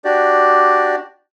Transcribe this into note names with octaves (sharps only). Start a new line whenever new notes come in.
D4 F#4 G4 D5